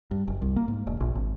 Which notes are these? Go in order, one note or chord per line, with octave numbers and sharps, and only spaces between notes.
G2
F#1
C2
A#3
G#2
E1
A#1
G#1